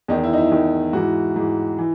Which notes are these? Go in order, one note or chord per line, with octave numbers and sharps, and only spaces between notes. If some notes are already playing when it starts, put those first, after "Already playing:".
E2 D#3 D#4
E4
D#4
E4
E2 D#3
G#2 E3 F#4
G#2 E3
E3